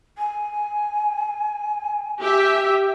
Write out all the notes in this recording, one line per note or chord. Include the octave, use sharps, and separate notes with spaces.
G#5
G4 E5